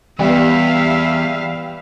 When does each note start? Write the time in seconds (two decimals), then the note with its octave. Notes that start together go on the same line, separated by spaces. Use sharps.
0.19 E2 E3 G3 B3 G4 E5 F5